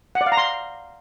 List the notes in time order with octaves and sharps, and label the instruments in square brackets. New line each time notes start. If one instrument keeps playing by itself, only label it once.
[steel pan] F#5
D5
F5
A#5
C6